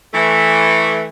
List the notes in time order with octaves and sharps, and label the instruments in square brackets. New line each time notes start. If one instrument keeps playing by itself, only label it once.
[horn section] E3 A3